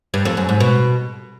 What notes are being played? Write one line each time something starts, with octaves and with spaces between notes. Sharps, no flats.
G2
F2
F#2
G#2
B2